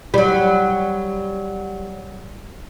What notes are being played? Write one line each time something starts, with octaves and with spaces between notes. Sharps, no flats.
F#3 G3